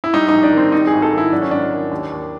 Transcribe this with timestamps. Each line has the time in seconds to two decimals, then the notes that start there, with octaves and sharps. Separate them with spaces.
0.04 E4
0.14 G3 D#4
0.28 A#1 D#4
0.43 D4
0.53 D#3 C4
0.72 G3 D#4
0.87 G#4
0.93 G#1
1.02 A4
1.12 D#3
1.18 E4
1.32 F#3 D4
1.42 C#4
1.51 G#1 D4
1.72 D#3
1.91 D#2
2.12 D#2